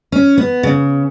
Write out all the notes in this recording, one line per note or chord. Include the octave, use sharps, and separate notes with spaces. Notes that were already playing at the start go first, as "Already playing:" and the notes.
C#4
B3
C#3